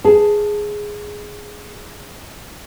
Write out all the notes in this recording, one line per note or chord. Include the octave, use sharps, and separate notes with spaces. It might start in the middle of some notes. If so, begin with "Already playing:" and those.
G#4 A5